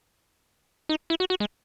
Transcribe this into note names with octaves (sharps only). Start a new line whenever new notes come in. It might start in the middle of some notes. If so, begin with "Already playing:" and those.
D#4
E4
F#4
F#4
G#3